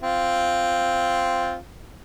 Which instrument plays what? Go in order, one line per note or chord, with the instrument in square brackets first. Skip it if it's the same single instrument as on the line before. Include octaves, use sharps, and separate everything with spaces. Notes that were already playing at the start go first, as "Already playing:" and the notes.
[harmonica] C4 F4